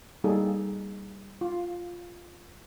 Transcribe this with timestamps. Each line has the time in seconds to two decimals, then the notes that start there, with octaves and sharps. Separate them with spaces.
0.24 G3 A#3 D#4 G#4 A4
1.41 F4